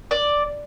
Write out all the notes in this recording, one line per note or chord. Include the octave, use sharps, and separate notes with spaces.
D5